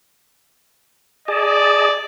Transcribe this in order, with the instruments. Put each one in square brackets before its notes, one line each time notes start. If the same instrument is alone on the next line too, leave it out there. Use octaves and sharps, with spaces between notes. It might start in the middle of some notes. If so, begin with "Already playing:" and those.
[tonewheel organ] G#4 D#5 A5 [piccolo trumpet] D5